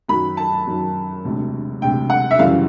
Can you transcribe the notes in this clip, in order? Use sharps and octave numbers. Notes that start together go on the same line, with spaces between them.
F#2 D#3 F#3 B5
A5
F#2 D#3 F#3
E1 D2 C3
E1 D2 C3 G5
F#5
E5
F#1 F#2 C#3 E3 G3 F5